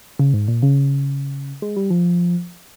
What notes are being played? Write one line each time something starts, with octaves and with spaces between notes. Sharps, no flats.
C#3
G#2
A#2
C#3
G#3
G3
F3